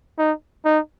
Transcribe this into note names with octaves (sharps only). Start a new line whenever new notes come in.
D#4
D#4